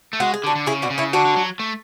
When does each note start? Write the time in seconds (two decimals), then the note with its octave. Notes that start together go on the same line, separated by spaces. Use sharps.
0.13 A3
0.20 G#3 F#4
0.34 G#4
0.44 D3
0.46 D4 F#4
0.55 D3
0.67 C#3 E4 G#4
0.82 B2 D4 F#4
0.90 C#3
0.98 C#4 E4
1.13 D3 D4 F#4
1.25 D3
1.36 F#3
1.59 A3